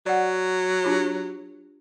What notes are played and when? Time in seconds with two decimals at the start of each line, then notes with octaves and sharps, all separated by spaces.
0.06 F#3 D5 F#5
0.85 D4 F4 G4